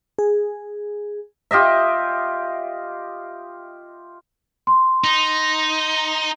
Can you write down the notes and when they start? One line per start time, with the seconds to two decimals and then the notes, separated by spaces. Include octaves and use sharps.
0.19 G#4
1.51 F4 G4 D#5 E5
4.67 C6
5.04 D#4